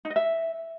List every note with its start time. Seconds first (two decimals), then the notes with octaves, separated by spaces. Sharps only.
0.05 D#4
0.10 D#5
0.16 E5